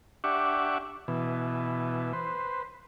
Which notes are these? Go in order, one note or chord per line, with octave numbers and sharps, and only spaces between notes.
D4 G4 E5 F#5 C#6 D6
B2 E3
B4 C5